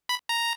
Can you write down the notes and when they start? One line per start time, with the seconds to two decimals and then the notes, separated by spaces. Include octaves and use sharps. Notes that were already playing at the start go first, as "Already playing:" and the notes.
0.09 B5
0.29 A#5